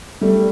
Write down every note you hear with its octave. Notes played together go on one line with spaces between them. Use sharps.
G3 A3